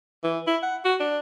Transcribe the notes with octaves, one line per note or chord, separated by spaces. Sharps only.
E3
E4
F#5
F#4
D4